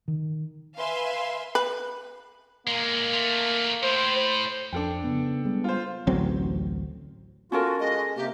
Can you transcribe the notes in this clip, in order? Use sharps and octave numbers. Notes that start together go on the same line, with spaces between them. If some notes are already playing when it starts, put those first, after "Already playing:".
D#3
B4 E5 F5 G#5 C6
B4
A#2 G#3 A#3
A3 F4
A2 C5
C5
F2 D4 A4 G5
C#3 B3
G3 G#3 B3
F4 C5
A1 D2 F#3 C4
C#4 F4 F#4 A4 A#4
G#3 D#5
C3 A#3 G4